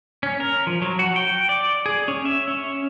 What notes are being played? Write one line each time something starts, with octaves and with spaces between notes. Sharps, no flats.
C#4
A#4
F3
F#3
F#4
G5
D5
G#4
C#4
E5
C#4